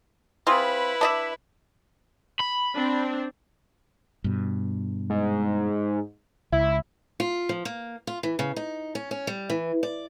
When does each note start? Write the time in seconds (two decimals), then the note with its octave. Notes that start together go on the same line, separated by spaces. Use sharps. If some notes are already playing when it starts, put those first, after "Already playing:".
0.47 C4 E4 F4 G#4 B4
1.01 D4 D#5 E5
2.40 B5
2.74 C4 D4
4.24 G2 B2
5.10 G#2
6.52 C#2 E4
7.20 F4
7.49 F3
7.65 A#3
8.07 F4
8.23 E3
8.39 C#3
8.56 D#4
8.95 C#4
9.11 C#4
9.27 G3
9.50 E3
9.83 D5